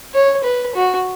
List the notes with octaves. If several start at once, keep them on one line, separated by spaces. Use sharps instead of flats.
C#5
B4
F#4